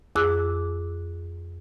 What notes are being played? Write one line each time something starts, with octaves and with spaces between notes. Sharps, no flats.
F2 G#4 D6 E6 F#6